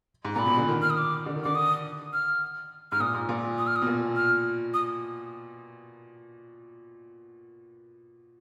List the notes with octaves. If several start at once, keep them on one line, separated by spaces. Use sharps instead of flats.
G#2
A#2 A#5 B5
B2
D3
D#3
F6
D#6
D6
D3
D#3
D3 D6
D#6
F6
G#2 F6
A#2 D#6
G#2
A#2
D#6
F6
D#6
B2
A#2
F6
D#6